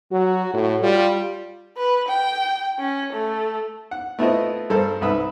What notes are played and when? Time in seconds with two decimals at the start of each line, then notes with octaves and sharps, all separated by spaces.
0.12 F#3 F#4
0.54 A2 F#4
0.82 G3 F4
1.78 B4
2.08 G5
2.79 C#4
3.12 A3
3.91 F#5
4.19 A3 B3 C4 E4 F4 D#5
4.70 G2 A4 A#4 C5
5.01 C2 G#2 B4 E5 B5 D#6